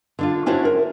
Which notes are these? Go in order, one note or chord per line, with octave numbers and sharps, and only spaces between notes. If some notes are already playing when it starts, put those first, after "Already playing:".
D3 D4 F4
C#4 D4 E4 F#4 C5 C#5
A#4